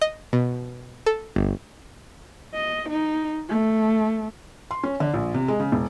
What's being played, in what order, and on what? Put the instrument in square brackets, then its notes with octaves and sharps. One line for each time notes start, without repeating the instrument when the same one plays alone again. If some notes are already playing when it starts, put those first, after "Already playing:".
[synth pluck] D#5
B2
A4
G1
[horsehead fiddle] D#5
D#4
A3
[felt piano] C6
C#4
D3
A#1
C3
G#3
C#3
E1